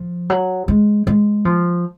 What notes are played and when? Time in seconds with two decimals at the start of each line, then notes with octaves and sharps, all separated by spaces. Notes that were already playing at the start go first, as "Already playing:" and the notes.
Already playing: F3
0.30 F#3
0.68 G#3
1.07 G#3
1.45 F3